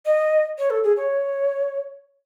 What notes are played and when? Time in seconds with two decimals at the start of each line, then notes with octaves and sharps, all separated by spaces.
0.06 D#5
0.58 C#5
0.70 A4
0.84 G#4
0.97 C#5